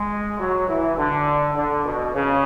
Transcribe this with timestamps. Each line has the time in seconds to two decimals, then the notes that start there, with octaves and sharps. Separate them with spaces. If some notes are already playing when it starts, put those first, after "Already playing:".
Already playing: G#3
0.39 F#3
0.68 E3
0.98 D3
1.56 D3
1.84 B2
2.13 C#3